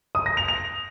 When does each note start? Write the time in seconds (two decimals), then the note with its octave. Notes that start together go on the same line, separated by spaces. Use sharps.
0.15 D#6
0.26 A#6
0.37 F7
0.48 F7